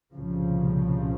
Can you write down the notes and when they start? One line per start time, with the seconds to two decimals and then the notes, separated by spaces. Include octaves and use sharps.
0.14 C2 A#2 C#3 F3